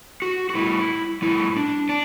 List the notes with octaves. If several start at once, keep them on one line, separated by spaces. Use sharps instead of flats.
F#4
F#4
A2 G3 E4
A2 G3 E4
D4
D4